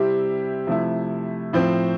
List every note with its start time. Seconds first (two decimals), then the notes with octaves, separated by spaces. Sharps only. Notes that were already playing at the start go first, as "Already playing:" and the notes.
Already playing: C3 G3 C4 E4 G4
0.67 C3 F3 A3 E4
1.53 A2 F3 C4